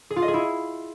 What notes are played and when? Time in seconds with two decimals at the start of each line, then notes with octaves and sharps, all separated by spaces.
0.11 G#4
0.16 F4
0.22 D#5
0.28 G#4
0.34 E4